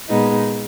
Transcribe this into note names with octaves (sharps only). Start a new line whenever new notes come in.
A#2 G#3 B3 D#4